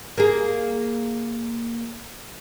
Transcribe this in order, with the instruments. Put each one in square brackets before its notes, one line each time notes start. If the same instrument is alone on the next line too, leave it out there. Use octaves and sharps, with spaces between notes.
[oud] A#3 G#4